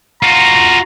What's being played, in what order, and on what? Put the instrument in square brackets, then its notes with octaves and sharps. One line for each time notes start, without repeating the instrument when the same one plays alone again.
[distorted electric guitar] F4 F#4 [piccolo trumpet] A#5